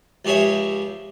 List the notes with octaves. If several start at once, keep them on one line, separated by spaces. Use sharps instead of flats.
C#2 F3 G4 G#4 C#5 E5